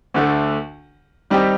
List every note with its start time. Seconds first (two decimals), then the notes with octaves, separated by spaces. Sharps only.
0.14 D2 D3 A3
1.30 D#3 G3 C4 D#4 G4